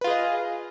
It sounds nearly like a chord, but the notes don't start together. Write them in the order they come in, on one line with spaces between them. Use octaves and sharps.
B4 F4 G#4 D#5